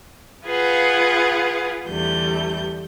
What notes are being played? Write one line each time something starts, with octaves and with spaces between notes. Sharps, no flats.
F4 G#4 B4 F5 F#5
E2 D3 G3 A3 G6